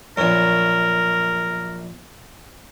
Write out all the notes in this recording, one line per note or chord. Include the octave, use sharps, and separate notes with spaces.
A#1 F#2 A#4